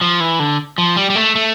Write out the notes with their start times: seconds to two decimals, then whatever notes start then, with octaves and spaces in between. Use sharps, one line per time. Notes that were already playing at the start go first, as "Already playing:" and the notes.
0.01 F3
0.20 E3
0.40 D3
0.78 F3
0.96 G3
1.10 G3
1.16 A3
1.35 A3